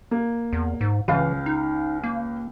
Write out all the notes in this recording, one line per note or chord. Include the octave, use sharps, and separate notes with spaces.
A#3
E2
G#2
C#2 E3 F5
D#4
A#3